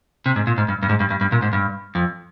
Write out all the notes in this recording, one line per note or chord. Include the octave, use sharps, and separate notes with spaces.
C3
G#2
A#2
G#2
G2
G2
G#2
G2
G2
G2
A#2
G#2
G2
F2